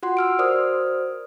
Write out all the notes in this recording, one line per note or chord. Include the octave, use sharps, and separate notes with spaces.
F4 F#4 F#5 C6
E6 F6 D7
F#4 A#4 C5 D5 D#6 F6